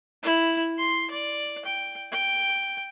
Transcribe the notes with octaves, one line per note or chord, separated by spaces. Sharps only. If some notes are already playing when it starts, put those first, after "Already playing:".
E4
C6
D5
G5
G5